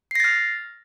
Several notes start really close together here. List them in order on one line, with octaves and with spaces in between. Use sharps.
C7 A#6 A6 F6